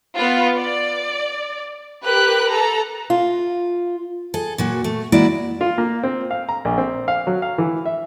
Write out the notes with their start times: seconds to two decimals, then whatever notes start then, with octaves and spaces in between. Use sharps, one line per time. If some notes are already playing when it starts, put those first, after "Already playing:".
0.14 B3 F4
0.58 D5
2.04 G4 A#4 B4 F#6
2.51 A4 A#5
3.10 F4
4.34 G#4 A4
4.58 A#2 F#3 F#4
4.84 A3
5.12 E3 G#3 A#3 E4 F#4 D5
5.61 F4
5.78 A#3
6.03 C4
6.31 F5
6.49 A#5
6.65 A#1
6.78 C4
7.08 F5
7.27 F#3
7.42 F5
7.58 E3
7.85 E5